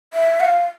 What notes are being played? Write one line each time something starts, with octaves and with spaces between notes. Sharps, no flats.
E5
F#5
F5